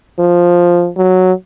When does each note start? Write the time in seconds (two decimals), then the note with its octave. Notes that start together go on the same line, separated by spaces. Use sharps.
0.19 F3
0.97 F#3